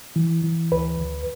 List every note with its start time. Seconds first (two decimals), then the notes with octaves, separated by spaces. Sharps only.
0.16 E3
0.43 E3
0.72 D2 B4
0.99 D2